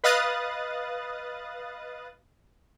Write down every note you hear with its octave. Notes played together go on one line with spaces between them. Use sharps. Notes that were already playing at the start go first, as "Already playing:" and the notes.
B4 D#5 F5 D#6 F#6 A6